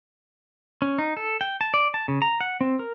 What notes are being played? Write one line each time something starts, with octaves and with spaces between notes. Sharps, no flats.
C#4
D#4
A4
G5
A5
D5
A5
C#3
A#5
F#5
C4
A#4